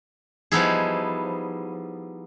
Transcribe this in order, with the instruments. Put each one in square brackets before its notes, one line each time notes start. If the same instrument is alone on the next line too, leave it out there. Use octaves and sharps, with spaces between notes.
[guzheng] F3 G3 B3 D#4 E4 G#4